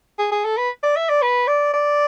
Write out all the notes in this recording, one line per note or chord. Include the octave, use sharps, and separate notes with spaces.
G#4
G#4
A4
B4
D5
E5
D5
B4
D5
D5